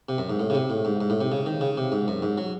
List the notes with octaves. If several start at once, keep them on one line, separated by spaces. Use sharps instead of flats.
C3
F#2
G#2
A2
C#3
C3
A2
G#2
G#2
A2
C3
C#3
D#3
C#3
C3
G#2
F#2
G#2
F#3